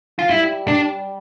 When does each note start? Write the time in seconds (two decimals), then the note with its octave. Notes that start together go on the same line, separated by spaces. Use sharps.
0.19 F4
0.30 G3 E4
0.68 D4